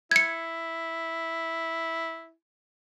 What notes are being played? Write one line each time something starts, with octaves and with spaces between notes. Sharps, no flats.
E4 G#6 C#7